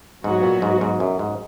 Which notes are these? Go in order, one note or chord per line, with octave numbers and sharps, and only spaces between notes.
G#2 F#3 B3 F#4
A#2
G#2
G#2
F#2
G#2